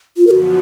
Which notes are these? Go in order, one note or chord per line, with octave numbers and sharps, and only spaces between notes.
F4
F#2 D3 F3 B3 F#4 A#4